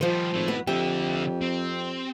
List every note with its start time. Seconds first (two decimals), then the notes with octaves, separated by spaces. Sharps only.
0.01 D#3 F3 G3 C5
0.34 G#1 A3 E4
0.48 B2 B3 B4
0.67 F2 D3 G4 E5
1.41 C4